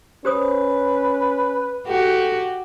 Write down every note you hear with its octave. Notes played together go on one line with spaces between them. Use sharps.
C#4 G4 B4 C5 D#6
F#4 G4 A4